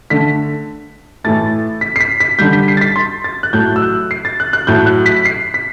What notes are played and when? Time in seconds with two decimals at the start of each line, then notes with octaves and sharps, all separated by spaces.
0.10 D3 A3 B6
1.24 A2 E3 A3 A6
1.81 B6
1.96 C7
2.00 B6
2.20 B6
2.39 D3 G3 G6
2.53 B6
2.68 C7
2.77 A6
2.81 B6
2.96 C6
3.24 A6
3.43 F#6
3.53 A2 F#3 A3 G6
3.76 E6
3.82 F#6
4.11 C7
4.25 A6
4.40 F#6
4.53 F#6
4.67 A2 F#3 A3 G6
4.86 F#6
5.06 B6
5.25 C7
5.54 B6